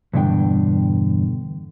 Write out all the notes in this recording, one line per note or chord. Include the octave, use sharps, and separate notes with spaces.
E2 G2 B2 D3 G5